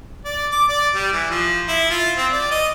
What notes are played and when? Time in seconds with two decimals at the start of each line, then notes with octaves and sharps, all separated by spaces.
0.25 D5
0.51 D6
0.69 D5
0.95 G3
1.12 E3
1.30 F3
1.68 E4
1.90 F4
2.17 C4
2.32 D5
2.51 D#5